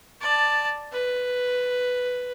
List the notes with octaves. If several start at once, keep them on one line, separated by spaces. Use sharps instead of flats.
D5 A5
B4